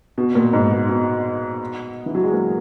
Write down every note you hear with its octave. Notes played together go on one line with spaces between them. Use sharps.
B2
A#2
G#2
B2
B2
E3
F#3
G#3
A#3